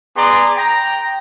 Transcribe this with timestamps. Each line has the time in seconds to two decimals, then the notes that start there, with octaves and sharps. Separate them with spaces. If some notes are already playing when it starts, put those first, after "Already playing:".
0.16 B3 G#4 D5 A#5 C6
0.56 G5 A#5